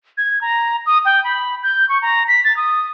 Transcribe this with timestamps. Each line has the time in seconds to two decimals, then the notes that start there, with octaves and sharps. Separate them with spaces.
0.18 G#6
0.41 A#5
0.86 D#6
1.05 G5
1.24 B5
1.63 G6
1.89 C#6
2.02 A#5
2.28 B6
2.45 A6
2.57 D#6